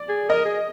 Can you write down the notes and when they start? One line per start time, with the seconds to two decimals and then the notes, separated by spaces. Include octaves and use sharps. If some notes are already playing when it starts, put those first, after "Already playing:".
Already playing: D5
0.09 G#4
0.29 A#4 D#5
0.45 G#4